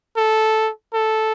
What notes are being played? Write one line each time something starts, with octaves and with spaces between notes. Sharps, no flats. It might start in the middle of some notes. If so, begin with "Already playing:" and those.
A4
A4